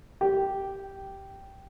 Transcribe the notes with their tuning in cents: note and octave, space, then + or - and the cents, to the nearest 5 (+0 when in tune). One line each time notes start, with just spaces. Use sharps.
G4 -5